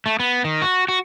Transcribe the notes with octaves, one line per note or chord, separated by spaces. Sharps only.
A3
B3
D#3
F#4
F#4